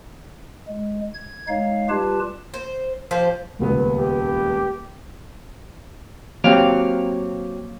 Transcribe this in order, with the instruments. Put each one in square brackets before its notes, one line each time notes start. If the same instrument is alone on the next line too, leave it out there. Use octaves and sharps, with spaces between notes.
[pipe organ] G#3
G#6
G#3 D#4 C#5 F5
G3 F4 G4 B4 A5
[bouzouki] C5
F3 G4 C5
[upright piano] D#1 C#2 B3
[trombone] G4
[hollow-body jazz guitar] F#3 C4 G4 [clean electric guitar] A#3 C#5 F5